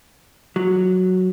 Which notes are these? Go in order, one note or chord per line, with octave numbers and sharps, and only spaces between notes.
F#3